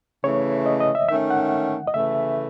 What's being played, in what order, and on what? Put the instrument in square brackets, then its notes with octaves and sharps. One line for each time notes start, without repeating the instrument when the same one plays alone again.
[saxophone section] C#3 E3 A3 [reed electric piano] C#5
[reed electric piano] D#5
D#5
E5
[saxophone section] D#3 A3 C#4 [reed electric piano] E5
[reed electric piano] F#5
D#5
[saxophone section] C#3 E3 A3 [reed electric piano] E5